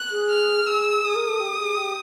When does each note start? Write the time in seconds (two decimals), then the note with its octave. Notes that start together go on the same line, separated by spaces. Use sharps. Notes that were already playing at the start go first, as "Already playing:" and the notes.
Already playing: F#6
0.11 G#4
0.30 F6
0.67 G#4 E6
1.04 G#4 D#6
1.16 A#4
1.28 A4
1.40 G4
1.59 G#4
1.77 G4